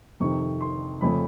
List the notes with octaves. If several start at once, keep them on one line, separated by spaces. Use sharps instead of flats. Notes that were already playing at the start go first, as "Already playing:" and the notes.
F2 C3 D#3 C#6
C6
F2 C#3 F3 A3 C#4 B5